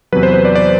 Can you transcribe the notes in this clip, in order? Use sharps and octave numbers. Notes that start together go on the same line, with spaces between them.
E2 C3 F#3 B4
C5
C5
D5
D5